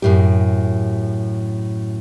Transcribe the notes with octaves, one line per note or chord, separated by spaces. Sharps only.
F#2 A2 G4